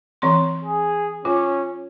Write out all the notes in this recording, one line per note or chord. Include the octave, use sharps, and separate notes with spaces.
E3 C4 C6
G#4
C#4 F4